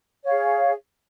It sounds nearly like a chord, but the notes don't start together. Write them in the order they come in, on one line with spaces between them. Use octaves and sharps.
C#5 F5 G#4